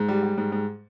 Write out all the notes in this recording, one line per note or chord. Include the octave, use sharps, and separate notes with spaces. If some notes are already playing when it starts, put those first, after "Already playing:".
Already playing: G#2
G3
G3
G#2
G#2